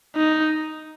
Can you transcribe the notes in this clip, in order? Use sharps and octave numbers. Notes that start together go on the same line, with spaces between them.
D#4